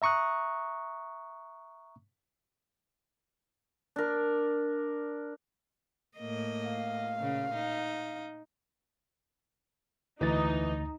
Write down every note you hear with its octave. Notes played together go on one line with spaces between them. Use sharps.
E5 A#5 C#6 D#6 F#6
D4 A#4
A2 A#3 D#5
F5
A#2 C#3
D#4
D2 E3 D#4 D#5 A6